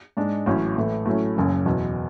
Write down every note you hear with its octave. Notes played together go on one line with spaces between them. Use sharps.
G#2 G#3 D4
A1 A2 F#3 C#4
A2 E3 A3
A2 F#3 A3 C#4 E4
F#1 F#2 C#3
E2 B2 F#3